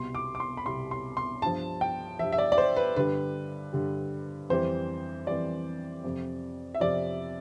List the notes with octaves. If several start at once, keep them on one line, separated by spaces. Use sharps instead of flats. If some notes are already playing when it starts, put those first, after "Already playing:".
Already playing: C2 B2 G3 C6
D6
D6
C6
B5
C2 B2 G3 C6
C6
C6
G2 F3 A5
G5
G2 F3 E5
E5
D5
D5
C5
B4
G2 D3 G3 B4
G2 D3 G3
F2 E3 G3 C5
F2 E3 G3 D5
F2 C3 F3
E5
F2 C3 F3 D5